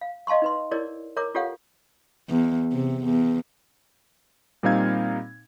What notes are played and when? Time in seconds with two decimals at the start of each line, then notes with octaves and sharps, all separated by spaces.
0.01 F5
0.27 D#5 F5 A5 C6 C#6
0.42 D#4 B4 C6
0.71 E4 G#4 A#4 C#5 D5
1.17 A#4 C#5 A#5 D6
1.35 F4 G4 A4 C#5 F5 F#5
2.30 E2
2.73 C3
3.05 E2
4.63 A#2 G3 C4 D#4 F5 G#6